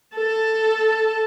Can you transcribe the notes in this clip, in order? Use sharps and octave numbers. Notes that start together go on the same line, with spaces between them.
A4 A5